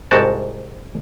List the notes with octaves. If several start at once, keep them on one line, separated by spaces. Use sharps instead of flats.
C2 G#2 F#4 G5 A5